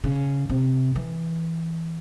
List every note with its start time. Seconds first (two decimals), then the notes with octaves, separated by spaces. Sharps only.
0.04 C#3
0.50 C3
0.96 E3